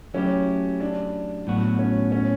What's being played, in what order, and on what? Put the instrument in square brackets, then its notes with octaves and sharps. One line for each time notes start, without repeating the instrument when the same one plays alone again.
[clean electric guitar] F#3 A3 E4 G4 [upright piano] C#4
[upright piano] D4
[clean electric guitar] A2 F#3 B3 F#4
[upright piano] C#4
C#4